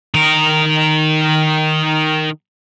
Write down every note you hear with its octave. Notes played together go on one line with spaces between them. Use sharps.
D#3 A#4